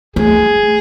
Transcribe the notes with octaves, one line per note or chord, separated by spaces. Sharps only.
A3 G#4